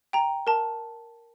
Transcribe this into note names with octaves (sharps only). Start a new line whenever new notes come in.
G5 A#5
A#4 A5